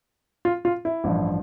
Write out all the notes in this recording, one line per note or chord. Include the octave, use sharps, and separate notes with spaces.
F4
F4
E4
A1 G2 F3